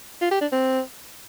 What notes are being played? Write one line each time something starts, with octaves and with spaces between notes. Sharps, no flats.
F4
G4
D4
C4